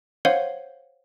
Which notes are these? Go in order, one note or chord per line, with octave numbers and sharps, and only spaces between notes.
C5 C#5 F5 F#5